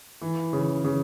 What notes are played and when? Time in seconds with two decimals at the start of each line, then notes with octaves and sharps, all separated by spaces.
0.22 E3
0.53 C#3
0.84 C#3